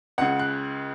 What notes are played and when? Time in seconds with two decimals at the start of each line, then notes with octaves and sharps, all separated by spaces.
0.18 C#2 C#3 F#5
0.39 F#6